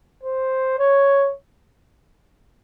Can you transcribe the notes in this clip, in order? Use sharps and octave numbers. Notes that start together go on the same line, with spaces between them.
C5
C#5